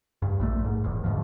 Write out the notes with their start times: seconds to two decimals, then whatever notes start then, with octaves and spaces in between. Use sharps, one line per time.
0.22 G2
0.39 A#1 A#2 A3
0.64 G#2
0.84 D#1 E2
1.04 D2 G#2 F3